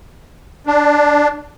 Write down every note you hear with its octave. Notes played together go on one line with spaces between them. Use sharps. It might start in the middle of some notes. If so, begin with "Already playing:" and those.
D4